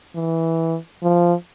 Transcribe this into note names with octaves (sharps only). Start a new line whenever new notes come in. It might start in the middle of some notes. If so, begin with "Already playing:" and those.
E3
F3